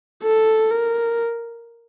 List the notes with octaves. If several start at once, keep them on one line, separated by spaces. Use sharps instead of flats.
A4
A#4